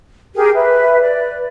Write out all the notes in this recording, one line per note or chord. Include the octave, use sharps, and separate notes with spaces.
G4 G#4 A#4
B4 E5
B4 D5